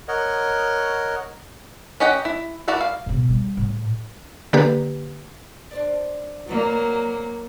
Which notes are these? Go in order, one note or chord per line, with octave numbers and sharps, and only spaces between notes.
A#4 C#5 D#5 F#5
C#4 G4 D#5 F#5 A#5
E4
E4 F#4 A#4 D5 E5
F5
G#2 B2
G3
A2
D3 A#3 G4 B4
D4 C5 D5
F2 F#3 A#3 B4 D5